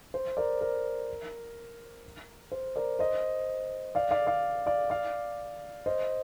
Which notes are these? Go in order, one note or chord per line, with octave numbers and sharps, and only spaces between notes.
C5
A#4 D5
A#4
C5
A#4 D5
C5 D#5
D5 F5
D5 F5
D5 F5
D5 F5
D5 F5
C5 D#5